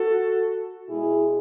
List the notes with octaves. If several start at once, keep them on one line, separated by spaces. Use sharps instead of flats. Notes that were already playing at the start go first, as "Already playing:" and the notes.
Already playing: F#4 A4
B2 G#3 E4 G#4